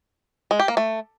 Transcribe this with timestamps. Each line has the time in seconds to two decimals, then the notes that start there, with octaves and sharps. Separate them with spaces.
0.51 G#3
0.60 G4
0.68 A#3
0.77 A3